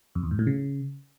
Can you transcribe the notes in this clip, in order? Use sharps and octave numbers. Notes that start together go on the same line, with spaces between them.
F2
E2
G#2
A2
C#3